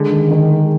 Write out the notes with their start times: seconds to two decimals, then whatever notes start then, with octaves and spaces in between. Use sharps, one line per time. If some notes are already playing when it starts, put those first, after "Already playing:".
Already playing: D3 G#3
0.11 D#3
0.31 D#3
0.49 G#3